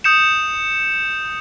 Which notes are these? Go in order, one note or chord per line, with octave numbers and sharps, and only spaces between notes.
D#6 G6 C#7 E7